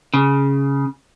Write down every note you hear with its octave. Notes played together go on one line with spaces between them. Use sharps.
C#3